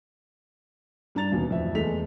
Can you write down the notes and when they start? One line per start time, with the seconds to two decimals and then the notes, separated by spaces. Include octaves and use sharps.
1.15 G2 D4 A#5 A6 F7
1.32 D#2 B2 E3 C#4
1.49 D1 F2 E5
1.75 E2 G#3 A3 A4 B6 F7